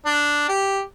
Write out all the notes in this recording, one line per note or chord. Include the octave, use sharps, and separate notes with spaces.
D4
G4